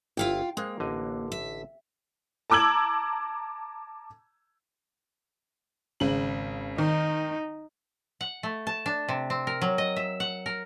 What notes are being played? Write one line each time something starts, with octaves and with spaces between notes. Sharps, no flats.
G1 E4 F4 F5 G5
G#3 A#3 C5 F5
A1 D3 D#5
E5
A5 A#5 D6 E6 G#6 F#7
G#1 C#3 F#7
D#3 D#4
F#5
A3
A5
D4
C3
C4
A#4
F#3
D#5
E5
F#5
A#4